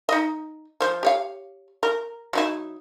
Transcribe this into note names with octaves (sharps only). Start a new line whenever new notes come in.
D#4 D#5
F3 C5
G4 C#5 F5
A#4
F#3 D#4 E4